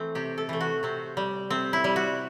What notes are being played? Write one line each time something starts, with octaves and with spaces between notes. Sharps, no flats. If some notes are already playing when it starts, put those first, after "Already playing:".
Already playing: E3 A3 C4
C3 G4
A4
E3 A3
F#4
C3 C4
G3
C3 C4
E4
G3
F#4